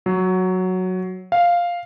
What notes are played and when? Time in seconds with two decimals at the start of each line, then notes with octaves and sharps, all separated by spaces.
0.06 F#3
1.32 F5